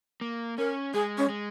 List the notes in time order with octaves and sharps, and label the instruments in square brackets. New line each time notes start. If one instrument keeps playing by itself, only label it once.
[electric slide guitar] A#3
[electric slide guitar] C#4 [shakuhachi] A#4
[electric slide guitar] G#3 [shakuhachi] G#4
[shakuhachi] C#4
[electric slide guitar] G#3